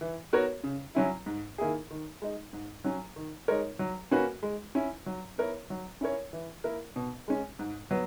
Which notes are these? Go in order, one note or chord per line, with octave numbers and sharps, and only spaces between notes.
E3
B3 F#4 A#4 C#5
C#3
F#3 C#4 E4
G#2
D#3 A#3 E4 G#4
D#3
G#3 D#4
G#2
F#3 C#4
D#3
G#3 D#4 A#4 C#5
F#3
A#3 C#4 F#4 B4
G#3
C#4 E4
F#3
B3 E4 A#4 C#5
F#3
C#4 E4 A#4 C#5
E3
A#3 E4 A#4
B2
G#3 C#4
G#2
F#3 B3